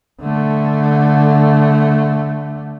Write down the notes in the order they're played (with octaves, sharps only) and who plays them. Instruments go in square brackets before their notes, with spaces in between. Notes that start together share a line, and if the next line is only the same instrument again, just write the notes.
[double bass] D3 A3